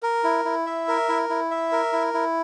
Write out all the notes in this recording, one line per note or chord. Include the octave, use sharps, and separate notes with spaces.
A#4
E4
E4
E5
A#4
E4
E4
E5
A#4
E4
E4